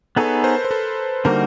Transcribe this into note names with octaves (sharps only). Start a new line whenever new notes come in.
B3 D#4 G#4 A4 B4 C#5
A#4 C5
C5
A4 B4
D3 G3 A#3 D#4 F#4 A#4 C5